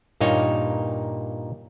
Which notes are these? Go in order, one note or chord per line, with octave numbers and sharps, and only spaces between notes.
G2 A#2 A#3 D#4 C#5